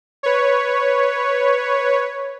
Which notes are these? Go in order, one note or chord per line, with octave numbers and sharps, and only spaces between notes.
B4 C#5